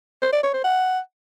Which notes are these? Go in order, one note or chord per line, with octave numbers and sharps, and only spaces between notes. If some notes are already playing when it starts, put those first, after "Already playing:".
C5
D5
C#5
C5
F#5